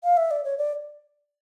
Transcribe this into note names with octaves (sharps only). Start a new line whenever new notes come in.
F5
E5
D5
C#5
D5